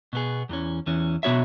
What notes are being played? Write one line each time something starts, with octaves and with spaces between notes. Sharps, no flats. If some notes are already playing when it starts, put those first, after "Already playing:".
B2 B3 G#4
E2 E3 C#4
E2 E3 C#4
B2 B3 F#4 C#5 E5